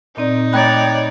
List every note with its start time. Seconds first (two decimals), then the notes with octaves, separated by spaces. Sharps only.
0.17 A#2 C4 D#4 D5
0.53 A3 C#5 D5 G5 A#5 B5 F#6